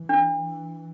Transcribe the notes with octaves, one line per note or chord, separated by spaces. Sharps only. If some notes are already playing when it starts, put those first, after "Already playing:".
Already playing: E3
D4